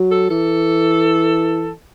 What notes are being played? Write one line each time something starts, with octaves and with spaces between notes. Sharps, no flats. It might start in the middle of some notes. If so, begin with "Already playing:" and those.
Already playing: F#3
A4
E3 A4